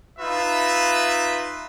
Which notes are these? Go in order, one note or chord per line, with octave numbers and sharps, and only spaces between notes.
D#4 F4 B4 E5